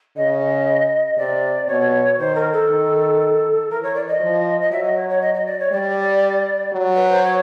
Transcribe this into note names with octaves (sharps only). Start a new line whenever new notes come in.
C#3 D#5
C3 D5
B2 C#5
D#3 C5
A#4
A4
D#3
E3 A#4
C#5
D5
D#5
F3
D#5
F#3 E5
D#5
C#5
C#5
D#5
D#5
D5
C#5
G3 D5
F#3
B4
C5
C#5